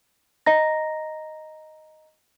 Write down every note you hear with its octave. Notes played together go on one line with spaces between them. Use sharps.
D#5 A#5 A#6